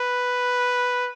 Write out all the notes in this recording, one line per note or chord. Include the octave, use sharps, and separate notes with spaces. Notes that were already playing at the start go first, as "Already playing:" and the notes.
Already playing: B4